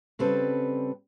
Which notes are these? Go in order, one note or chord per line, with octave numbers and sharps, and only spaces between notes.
C#3 G3 C4 A4 B4